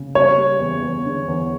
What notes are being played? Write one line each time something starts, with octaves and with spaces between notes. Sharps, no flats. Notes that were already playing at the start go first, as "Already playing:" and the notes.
Already playing: C#3
G3 C#5
G3
E2
E2
D3
E2